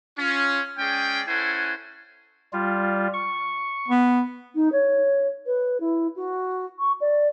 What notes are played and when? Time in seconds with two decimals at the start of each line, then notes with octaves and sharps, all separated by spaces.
0.18 C#4 F4
0.79 G#3 C#4 G#4 D5 G5
1.28 C#4 E4 A4 C5 F#5 G#5
2.53 G3 F4
3.13 C#6
3.88 B3
4.55 D#4
4.72 C#5
5.46 B4
5.80 E4
6.16 F#4
6.79 C#6
7.01 D5